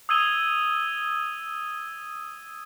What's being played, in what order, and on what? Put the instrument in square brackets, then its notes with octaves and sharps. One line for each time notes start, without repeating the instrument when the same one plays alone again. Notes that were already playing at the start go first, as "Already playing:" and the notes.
[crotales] D#6 E6 G#6 D#7 G7